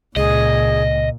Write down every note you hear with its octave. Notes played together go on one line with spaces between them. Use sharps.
C#2 A#2 C#3 G#4 D#5